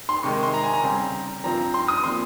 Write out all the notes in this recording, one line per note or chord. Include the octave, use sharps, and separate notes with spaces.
C6
C3 D#3 G#3 C#6
C6
A#5
G#5
A#5
C#3 G3 C4
A#5
G2 F3 C4 A#5
C6
D#6
A#2 F3 C4 C6